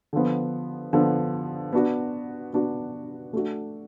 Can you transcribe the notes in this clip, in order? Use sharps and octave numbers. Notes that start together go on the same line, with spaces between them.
D3 F3 B3
D3 F3 B3
B3 D4 F#4
B3 D4 F#4
A3 D4 F#4